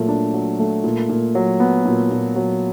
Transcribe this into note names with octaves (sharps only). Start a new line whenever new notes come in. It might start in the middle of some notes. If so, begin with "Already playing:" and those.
Already playing: A#2 F#3 A3
D4
F#3
A3
A#2
A#2
F#3
B3
A#2
A#2
F#3